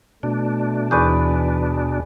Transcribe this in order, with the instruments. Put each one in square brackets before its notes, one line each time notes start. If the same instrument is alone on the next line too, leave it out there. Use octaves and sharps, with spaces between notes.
[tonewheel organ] B2 D4 [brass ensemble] A3
[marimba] D#2 C#6 G6 [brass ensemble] E3 [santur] G#4 B4 D5